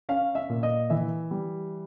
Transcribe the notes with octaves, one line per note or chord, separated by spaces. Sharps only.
C#4 F5
E5
A#2
D#5
E3 E5
G3